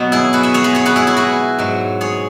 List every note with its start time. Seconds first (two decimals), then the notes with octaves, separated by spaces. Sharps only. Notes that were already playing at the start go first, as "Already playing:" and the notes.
Already playing: B2 F#3 B3
0.12 E4 G#4
0.33 F#4 B4
0.43 B4 E5
0.54 G#4 C#5
0.64 F#4 B4
0.75 G#4 C#5
0.86 F#4 B4
0.96 E4 G#4
1.07 E4 G#4
1.17 F#4 B4
1.59 G#2 F#3
2.01 G#4 C#5